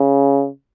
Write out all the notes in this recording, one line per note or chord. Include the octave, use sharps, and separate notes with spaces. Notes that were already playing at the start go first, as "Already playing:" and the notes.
Already playing: C#3